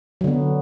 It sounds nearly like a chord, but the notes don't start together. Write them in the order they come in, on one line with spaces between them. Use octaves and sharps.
F#3 D3 B3